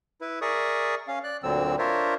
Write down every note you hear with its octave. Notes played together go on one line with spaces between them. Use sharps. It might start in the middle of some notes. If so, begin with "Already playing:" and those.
E4 B4
G#4 A#4 D5 E5 C#6 D#6
C#4 F5
D5 F#6
D2 A#2 D3 F#3 C4 E6
D4 F4 A#4 C5 C#5 E5